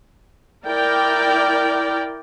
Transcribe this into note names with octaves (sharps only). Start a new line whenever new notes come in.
E4 A#4 D5 G5